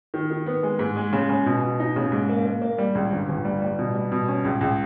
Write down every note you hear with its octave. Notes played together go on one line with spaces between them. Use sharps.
D#3
D#3
B3
G#3
G#2
G#3
C#3
C#3
B2
B2
D#4
C#3
G#2
A#3
A#3
A#3
G3
C#2
G1
G1
G3
G3
B2
G3
B2
C#4
C#2
C#2